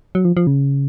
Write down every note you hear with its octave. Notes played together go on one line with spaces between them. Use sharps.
F#3
F3
F3
C#3